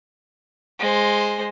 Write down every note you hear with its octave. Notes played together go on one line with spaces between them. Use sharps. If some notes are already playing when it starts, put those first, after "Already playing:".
G#3 C5